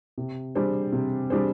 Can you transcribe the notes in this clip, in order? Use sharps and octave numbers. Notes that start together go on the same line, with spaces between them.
C3
G3 D4 G#4 C5
C3
G3 D4 G#4 C5